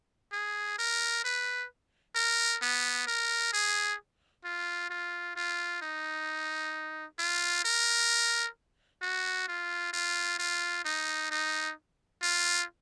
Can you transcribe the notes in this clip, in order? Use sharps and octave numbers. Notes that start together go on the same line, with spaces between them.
G#4
A#4
B4
A#4
B3
A#4
G#4
F4
F4
F4
D#4
F4
A#4
F#4
F4
F4
F4
D#4
D#4
F4